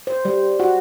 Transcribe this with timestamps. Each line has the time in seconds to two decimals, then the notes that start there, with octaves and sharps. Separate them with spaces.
0.07 C5
0.25 G3
0.60 F#4